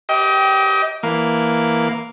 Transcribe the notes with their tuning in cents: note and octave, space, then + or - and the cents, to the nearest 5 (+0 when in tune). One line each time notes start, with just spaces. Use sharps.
G4 -15 D#5 +30 G5 -10
E3 +0 A#3 +0